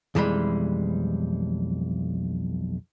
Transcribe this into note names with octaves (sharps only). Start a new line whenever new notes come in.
B1 F2 E3 G3 G#3 B5